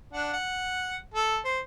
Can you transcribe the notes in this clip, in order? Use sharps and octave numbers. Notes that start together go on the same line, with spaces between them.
D4 F#5
F#5
A4
C5